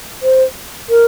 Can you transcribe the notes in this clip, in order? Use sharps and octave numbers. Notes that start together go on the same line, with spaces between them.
C5
A#4